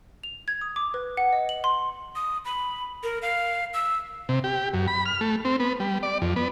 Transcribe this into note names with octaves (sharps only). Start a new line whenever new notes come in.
F7
G#6
D#6
D6
B4
F#5
D#5
F#7
C6
D#6
B5
A#4
F5
E6
C3
G4
F#2
B5
F6
A3
C4
B3
G3
D5
F2
B3